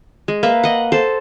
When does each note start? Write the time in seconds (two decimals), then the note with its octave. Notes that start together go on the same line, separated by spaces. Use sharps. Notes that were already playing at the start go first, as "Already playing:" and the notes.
0.28 G#3
0.43 A#3 B4 E5
0.63 D#5 F#5
0.92 A4 C5